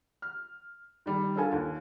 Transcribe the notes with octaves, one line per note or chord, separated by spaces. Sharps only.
F6
D#3 G3
D4 F4 A4 A#4 G#5 A5
D#2